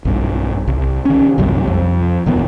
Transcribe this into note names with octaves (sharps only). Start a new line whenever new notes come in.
B1 G2
C2
D#3 C#4
B1 F#2 C3 G3
F2
D#1 D#3 B3